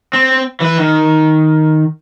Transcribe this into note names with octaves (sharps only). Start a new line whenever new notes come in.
C4
E3 B4
D#3